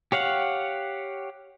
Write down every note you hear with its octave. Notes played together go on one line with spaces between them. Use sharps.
G4 C#5 F5 F#5